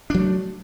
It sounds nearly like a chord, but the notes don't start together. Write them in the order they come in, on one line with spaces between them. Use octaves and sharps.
D4 F#3 A3